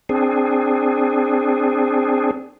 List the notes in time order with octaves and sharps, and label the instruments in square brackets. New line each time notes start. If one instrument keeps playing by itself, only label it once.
[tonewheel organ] C4 D4 G#4